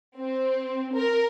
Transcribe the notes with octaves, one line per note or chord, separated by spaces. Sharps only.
C4
A#4